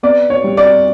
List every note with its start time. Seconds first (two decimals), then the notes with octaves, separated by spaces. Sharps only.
0.03 B3 D5
0.30 C#5
0.44 G3
0.57 D5